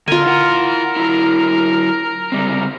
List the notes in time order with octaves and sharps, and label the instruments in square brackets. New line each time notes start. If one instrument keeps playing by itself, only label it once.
[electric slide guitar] D3 [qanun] F4 G#5 [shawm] A#4
[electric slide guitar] E4 F#5 [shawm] A#4
[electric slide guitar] F#3 E4
C#3 G3 C4